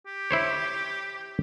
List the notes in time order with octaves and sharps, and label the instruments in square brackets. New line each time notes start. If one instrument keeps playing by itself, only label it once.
[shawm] G4
[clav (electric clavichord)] E4 C5 C#5